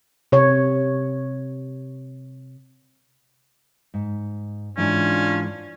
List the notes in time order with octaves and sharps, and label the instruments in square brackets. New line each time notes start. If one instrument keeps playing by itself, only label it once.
[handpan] C3 C#5
[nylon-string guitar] G#2
[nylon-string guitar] G#2 E3 G#3 [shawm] C#4 [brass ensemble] D4 F4